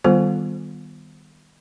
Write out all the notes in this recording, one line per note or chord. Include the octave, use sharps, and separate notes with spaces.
D#3 G3 B3 F4 A4 C5